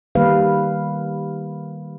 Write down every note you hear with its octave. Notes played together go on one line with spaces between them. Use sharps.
D#3 G3 A#3 B4 F5